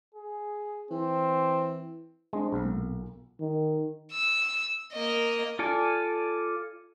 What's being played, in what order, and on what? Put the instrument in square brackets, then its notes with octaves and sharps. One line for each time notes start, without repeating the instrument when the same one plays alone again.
[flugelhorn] G#4
[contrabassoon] E3 [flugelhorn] C4
[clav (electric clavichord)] G#3 [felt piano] C4 D4
[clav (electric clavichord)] B1
[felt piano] A#2
[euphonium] D#3
[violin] E6
A#3 D#5
[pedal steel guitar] F4 A4 D5 G#5